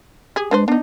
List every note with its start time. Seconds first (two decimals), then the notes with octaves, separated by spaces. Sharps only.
0.36 G4 G#4
0.51 G#3 D4 B4 C5
0.68 B3 D4 D#4